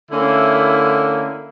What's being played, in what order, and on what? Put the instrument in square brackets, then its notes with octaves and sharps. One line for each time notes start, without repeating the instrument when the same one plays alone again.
[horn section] D3 A3 A#3 C#4 E4